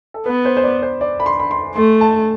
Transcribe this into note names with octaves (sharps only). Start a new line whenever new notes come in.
A4
B3 B4
C5
C5
D5
C5
D5
B5
C6
B5
C6
A3 C6
A5